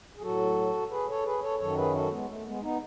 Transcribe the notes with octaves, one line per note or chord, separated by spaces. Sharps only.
G#4
A2 F#3 F#4 A4
G#4 B4
A4 C#5
G#4 B4
A4 C#5
F#2 D#3 F#3 A4 C#5
G#4 B4
F#4 A4
G#3 B3
A3
G#3 B3
B3 D#4